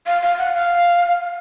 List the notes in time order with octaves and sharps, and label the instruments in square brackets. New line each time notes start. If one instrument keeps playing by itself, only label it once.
[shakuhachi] F5
F5
F#5
F5